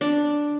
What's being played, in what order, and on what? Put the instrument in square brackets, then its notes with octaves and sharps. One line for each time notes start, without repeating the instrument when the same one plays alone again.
[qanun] D4